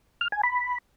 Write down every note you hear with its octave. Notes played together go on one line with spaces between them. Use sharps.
F6
G#5
B5